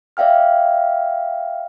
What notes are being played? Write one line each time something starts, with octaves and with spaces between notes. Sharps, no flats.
D5 E5 F5 G5 F6